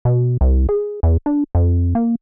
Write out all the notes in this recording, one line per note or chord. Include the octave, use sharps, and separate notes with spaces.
B2
C2
G#4
E2
D4
F2
A#3